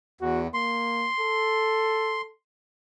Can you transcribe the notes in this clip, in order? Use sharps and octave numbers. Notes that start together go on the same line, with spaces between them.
E2 F#4
A#3 C6
A4